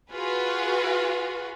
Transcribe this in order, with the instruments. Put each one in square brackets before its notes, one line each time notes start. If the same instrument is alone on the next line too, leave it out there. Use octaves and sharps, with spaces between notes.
[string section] F4 F#4 G#4 B4